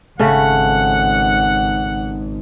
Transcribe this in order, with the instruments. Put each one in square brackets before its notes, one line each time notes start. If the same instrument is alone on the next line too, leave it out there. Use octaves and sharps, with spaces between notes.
[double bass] G#1 [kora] C#3 A3 C#4 [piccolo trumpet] F#5